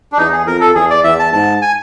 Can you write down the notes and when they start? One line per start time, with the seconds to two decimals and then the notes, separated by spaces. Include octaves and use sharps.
0.12 D4
0.17 E2 D#4
0.32 G#4
0.46 F2 A#4
0.61 A4
0.75 E2 G#4
0.90 D5
1.04 E2 E5
1.19 A5
1.33 G#2 A5
1.62 G#5